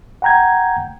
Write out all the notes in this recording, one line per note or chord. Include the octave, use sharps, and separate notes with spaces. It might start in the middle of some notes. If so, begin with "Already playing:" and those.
F#5 G5 A#5 G6 G#6